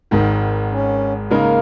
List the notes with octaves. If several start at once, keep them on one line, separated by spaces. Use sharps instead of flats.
G#1 G#2 D#3
C#4
C#3 G#3 A#3 D#4 A#4